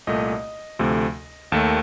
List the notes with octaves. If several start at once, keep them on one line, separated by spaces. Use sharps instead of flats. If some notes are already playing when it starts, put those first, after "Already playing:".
C2 A#2 A3 D#5
D2 C3 F3 A3
D#2 D#3 A3 A5